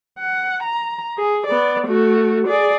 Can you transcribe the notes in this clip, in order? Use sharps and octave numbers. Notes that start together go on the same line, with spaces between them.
F#5
A#5
G#4
B3 D5
A3 F#4
G#4 D5